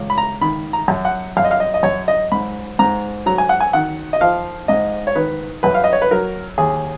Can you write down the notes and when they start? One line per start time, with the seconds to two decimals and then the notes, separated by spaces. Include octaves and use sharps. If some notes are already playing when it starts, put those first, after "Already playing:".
Already playing: C#2
0.10 B5
0.18 A#5
0.41 D#3 B5
0.73 A#5
0.88 F#2
1.05 F#5
1.37 F#2 F5
1.44 D#5
1.51 F5
1.60 D#5
1.74 D#5
1.83 F#2 C#5
2.08 D#5
2.32 G#2 B5
2.79 G#2 A#5
3.26 F#3 A#5
3.38 G#5
3.49 F#5
3.60 G#5
3.73 D#3 F#5
4.13 D#5
4.21 F3 F5
4.68 G#2 D#5
5.07 C#5
5.16 D#3 B4
5.63 F#2 B4
5.74 F5
5.84 D#5
5.93 C#5
6.02 B4
6.11 F#3 A#4
6.58 D#2 G#4